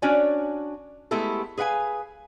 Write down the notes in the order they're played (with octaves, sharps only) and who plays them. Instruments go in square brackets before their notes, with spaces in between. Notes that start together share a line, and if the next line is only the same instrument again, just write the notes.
[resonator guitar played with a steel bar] C#4 D4 F#4 C#5 D5 G#5
G#3 A3 B3 E4 G4 A4
G#4 B4 F5 F#5 G#5